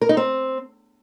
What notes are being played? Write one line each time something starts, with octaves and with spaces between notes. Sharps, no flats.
A#4
D#4
C4